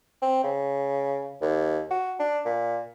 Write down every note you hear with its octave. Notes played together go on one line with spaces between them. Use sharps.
C4
C#3
D#2
F#4
D4
A#2